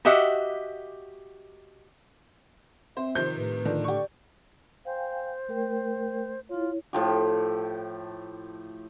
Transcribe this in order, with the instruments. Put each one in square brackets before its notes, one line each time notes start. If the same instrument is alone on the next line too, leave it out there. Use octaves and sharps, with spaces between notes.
[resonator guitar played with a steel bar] F#4 G4 D#5 E5 F#5
[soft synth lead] C4 [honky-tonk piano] C5 [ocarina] E5
[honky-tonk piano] C3 D#3 F3 [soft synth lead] C5 [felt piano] G6
[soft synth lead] A2 [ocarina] B4
[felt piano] D3 [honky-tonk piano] D#3 F3
[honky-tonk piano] G4 C#6 [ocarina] D5
[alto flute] C5 [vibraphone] F5 G5 G#5
[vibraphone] A3 A#4 G5
[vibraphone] E4 C#5 [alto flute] F4
[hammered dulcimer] A2 F3 G4